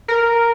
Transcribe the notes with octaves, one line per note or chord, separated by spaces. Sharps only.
A#4